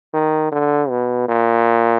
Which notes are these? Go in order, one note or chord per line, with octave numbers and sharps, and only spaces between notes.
D#3
D3
B2
A#2